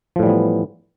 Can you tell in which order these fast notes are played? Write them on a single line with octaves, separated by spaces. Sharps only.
F3 A2 G3 E3 B3